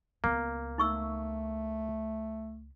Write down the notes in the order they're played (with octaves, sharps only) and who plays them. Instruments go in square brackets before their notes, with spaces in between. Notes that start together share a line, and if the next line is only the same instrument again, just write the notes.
[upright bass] C#2 B3 [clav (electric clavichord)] A#3
[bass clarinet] A3 [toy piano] D#4 C#6 E6